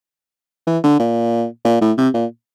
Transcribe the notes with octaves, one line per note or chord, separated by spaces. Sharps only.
E3
D3
A#2
A#2
A2
C3
A#2